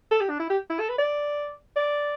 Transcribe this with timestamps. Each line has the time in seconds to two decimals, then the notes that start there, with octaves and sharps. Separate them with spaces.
0.11 A4
0.21 G4
0.30 D4
0.39 E4
0.50 G4
0.70 E4
0.79 A4
0.89 B4
0.99 D5
1.76 D5